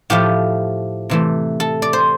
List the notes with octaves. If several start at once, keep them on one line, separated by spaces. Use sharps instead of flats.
A2 F3 A3 G4
C3 E3 A3
A4
D5
C5